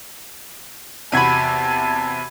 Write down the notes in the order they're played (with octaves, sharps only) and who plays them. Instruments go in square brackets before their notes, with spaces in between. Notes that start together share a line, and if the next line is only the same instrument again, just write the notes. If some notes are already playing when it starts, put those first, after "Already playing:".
[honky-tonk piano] E2 C3 F#4 [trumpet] A5 [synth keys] B5 G#6 D#7